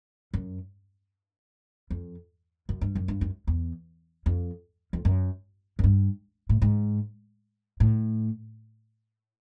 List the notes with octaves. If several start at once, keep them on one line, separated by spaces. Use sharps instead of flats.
F#2
F2
F#2
G2
F#2
G2
F#2
E2
F2
F2
F#2
F#2
G2
A2
G#2
A2